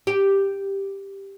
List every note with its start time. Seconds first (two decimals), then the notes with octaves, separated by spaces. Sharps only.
0.07 G4